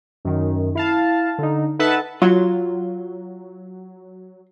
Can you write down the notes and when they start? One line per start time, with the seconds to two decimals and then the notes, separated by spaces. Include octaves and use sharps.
0.25 F#2 D#3
0.75 E4 F5 A5
1.38 D3 D#4
1.79 D#4 A4 B4 E5 F#5 A5
2.22 F#3 F4